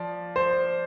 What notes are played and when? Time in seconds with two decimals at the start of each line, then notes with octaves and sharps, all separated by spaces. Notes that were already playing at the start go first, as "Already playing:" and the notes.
Already playing: F3 D5
0.36 C5